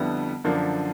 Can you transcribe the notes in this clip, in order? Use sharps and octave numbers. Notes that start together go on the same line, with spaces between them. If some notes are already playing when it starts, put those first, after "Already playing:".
Already playing: F2 D3 G3 B3 E4
F#2 D3 F3 A#3 D4